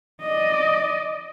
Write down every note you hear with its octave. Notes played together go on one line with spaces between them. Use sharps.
D5 D#5